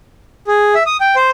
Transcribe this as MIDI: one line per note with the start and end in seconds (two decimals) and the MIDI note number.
0.47 0.74 68
0.75 0.83 76
0.86 0.97 87
1.01 1.15 79
1.16 1.30 72